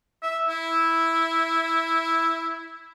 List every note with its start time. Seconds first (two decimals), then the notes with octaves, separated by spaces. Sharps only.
0.23 E5
0.48 E4